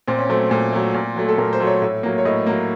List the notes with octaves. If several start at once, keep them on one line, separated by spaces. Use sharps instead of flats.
A#2 C4
C#4
F#3 A3 C4
A#2
F#3 A3
A#2
F#3 A3
A4
A#2 A#4
C5
F#3 A3
C#5
A2
F#3 A#3
C#5
A2 D#5
F#3 A#3